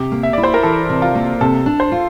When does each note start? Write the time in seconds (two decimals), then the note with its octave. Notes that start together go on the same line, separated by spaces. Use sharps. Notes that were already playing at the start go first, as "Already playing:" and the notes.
Already playing: C3 G4
0.12 A#3
0.23 E5
0.33 E4 D5
0.43 C5
0.54 A#4
0.63 E3 A4
0.89 C3
1.02 F4
1.15 A#3
1.41 C3 A4
1.66 D4
1.80 C5
1.92 F4